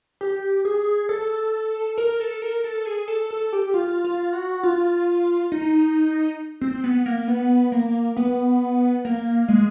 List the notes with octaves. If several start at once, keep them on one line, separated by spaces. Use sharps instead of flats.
G4
G#4
A4
A#4
A4
A#4
A4
G#4
A4
A4
G4
F4
F4
F#4
F4
D#4
C4
B3
A#3
B3
A#3
B3
A#3
G#3